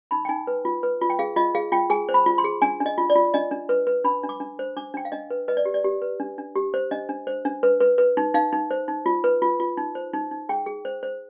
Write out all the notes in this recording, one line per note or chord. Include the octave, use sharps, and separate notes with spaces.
D#4 B5
G5
D#4 G#5
B4
F4
B4
F4
G5
G#4 F5
F4 D#5
G#4 F5
F4 G5
G#4 G#5
C5
B5
F4
C6
G#4
D4 G#5
D4
D#5
F4
D5
F4
D4 D#5
D4
B4
B4
D4 B5
D4
D6
D4
C5
D4 D6
D4 G5
F5
D4 D#5
B4
B4 D#5
D5
G4
D5
G4
B4
D4
D4
G4
C5
D4 D#5
D4
C5
D4
B4
B4
B4
D#4
D#4 F5
D#4
C5
D#4
F4
B4
F4
F4
D#4
C5
D#4
D#4
G#4 G5
G#4
C5
C5